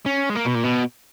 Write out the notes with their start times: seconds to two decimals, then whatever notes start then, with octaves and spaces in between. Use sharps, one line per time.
0.06 C#4
0.30 G#3
0.35 A#3
0.45 B2
0.54 A#2
0.63 B2